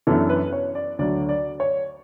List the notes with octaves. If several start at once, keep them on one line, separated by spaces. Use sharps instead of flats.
F#2 E3 B3 D4 A4
B4
C#5
D5
D2 D3 F#3 D5
D5
C#5